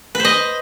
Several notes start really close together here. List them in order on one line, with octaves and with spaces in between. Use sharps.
B4 C5 D#5